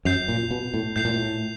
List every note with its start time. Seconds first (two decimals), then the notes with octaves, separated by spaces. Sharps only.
0.05 F#2 G6 C7 F7
0.28 A#2
0.51 B2
0.74 A2
0.96 A2 G6 C7 F7
1.05 A#2
1.14 A2